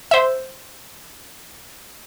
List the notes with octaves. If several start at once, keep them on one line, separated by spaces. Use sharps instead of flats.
C5 E5